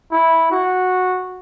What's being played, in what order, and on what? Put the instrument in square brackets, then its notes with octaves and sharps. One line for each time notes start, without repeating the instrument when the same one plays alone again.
[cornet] E4
F#4